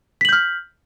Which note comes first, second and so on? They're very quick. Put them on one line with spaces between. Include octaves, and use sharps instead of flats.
B6 F#7 G6 F6